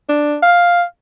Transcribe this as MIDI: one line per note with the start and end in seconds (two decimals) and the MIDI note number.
0.09 0.37 62
0.43 0.83 77